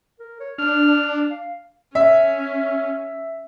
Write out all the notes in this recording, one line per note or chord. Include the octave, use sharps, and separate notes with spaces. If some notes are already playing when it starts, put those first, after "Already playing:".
A#4
C#5
D4 F6
F5
C#4 E5